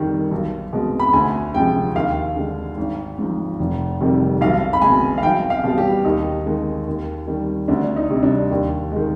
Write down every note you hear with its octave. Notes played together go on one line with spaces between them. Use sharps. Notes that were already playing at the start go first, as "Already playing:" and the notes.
Already playing: F2 D#3 G3
B1
B2 G#3
B5
D2 G#5
C3 F3 G#3 G5
D#2 F5
D3 G#3
G#1
G#2 F3
F1
F2 C3 D#3 G3
B1 F5
B5
B2 G#3 G#5
F5
B1 G5
F5
B2 G3
G4
D#2 D#4
D#3 G#3
D#2
D#3 G3
D2 D4
D#4
C3 G3
D4
D#2
D#3 G#3